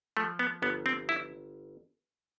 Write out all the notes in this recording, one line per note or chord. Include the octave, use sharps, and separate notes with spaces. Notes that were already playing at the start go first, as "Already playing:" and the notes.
F3 A3
B3
G1 B3
C4
E4